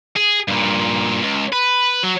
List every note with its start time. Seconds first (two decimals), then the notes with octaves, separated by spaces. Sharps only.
0.16 G#4
0.48 G2 A#2
1.22 C#2
1.53 B4
2.04 F#3